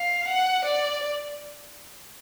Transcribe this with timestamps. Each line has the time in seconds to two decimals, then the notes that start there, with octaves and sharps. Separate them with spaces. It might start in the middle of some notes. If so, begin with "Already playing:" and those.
Already playing: F5
0.28 F#5
0.65 D5